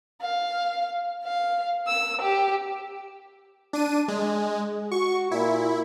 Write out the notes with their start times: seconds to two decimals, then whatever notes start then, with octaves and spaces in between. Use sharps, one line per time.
0.22 F5
1.24 F5
1.87 E6
2.21 G4
3.73 D4 D#7
4.08 G#3
4.92 F#4 C#6
5.32 A#2 E4